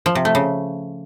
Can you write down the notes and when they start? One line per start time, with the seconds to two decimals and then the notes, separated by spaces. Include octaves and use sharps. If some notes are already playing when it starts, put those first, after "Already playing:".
0.06 F3
0.15 C3
0.25 A3
0.35 C#3